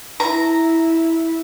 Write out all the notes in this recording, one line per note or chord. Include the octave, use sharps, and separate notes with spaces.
E4 A#5